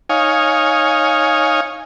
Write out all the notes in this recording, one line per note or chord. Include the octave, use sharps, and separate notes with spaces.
D#4 C#5 F5 G#5